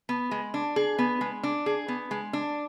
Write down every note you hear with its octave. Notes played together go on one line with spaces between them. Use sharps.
B3
G#3
D4
G#4
B3
G#3
D4
G#4
B3
G#3
D4